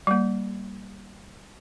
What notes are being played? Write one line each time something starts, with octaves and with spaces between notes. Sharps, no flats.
G3 A#3